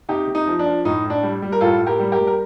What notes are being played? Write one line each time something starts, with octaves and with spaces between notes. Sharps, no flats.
C3 D#4 G4
C3
D#4
F3
D4
F3
A2 D#4
A2
D4
G3
G3
A#4
A2 F4 A4
A2
G4 A#4
G3
G4 A#4
G3
A#4